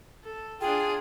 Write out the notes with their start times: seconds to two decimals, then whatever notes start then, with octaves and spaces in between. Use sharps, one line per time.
0.24 A4
0.61 D4 F4 G#4 G5